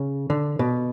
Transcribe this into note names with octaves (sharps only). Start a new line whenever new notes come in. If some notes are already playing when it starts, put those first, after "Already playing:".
Already playing: C#3
D3
B2